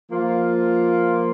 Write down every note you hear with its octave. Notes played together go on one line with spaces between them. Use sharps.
F3 A#3 F4